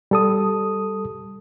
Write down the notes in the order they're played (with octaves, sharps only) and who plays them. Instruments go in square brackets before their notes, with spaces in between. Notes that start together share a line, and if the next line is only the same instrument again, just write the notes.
[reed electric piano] G3 A4 D#6